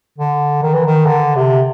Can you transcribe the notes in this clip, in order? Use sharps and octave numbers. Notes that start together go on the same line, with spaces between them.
D3
D#3
E3
D#3
D3
C3